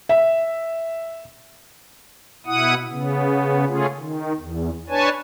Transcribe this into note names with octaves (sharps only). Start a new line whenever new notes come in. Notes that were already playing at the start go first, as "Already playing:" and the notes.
E5
B2 E4 F#5 D#6
C#3 B3
C#3 A3 C#4 F4 G#4
D#3
E2
D4 B4 C#5 G#5 A5